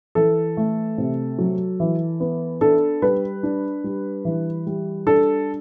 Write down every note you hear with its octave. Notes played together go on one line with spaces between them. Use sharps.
E3 A4
A3
C3
F#3
E3
B3
D4 A4
G3 B4
D4
G3
E3
G3
D4 A4